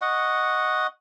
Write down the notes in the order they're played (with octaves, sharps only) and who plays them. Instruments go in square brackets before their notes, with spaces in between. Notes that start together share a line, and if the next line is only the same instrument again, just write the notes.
[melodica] D#5 F#5 C#6